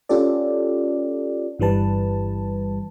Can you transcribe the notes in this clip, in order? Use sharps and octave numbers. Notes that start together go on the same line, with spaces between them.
C#4 F4 G4 A4 D5
G1 G2 E3 G3 B4 A5